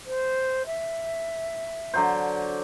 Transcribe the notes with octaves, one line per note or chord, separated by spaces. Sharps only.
C5
E5
D3 F#3 C5